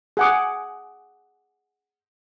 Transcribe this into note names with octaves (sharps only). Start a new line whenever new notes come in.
G#4 F#5 D6